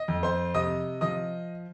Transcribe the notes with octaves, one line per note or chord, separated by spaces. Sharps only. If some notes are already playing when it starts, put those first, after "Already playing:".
Already playing: D#5
F2
C5 C6
C3 D#5 D#6
F3 D#5 D#6